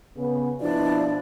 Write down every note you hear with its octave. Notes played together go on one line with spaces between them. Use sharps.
C#3 B3
B2 F3 D4 E4 D5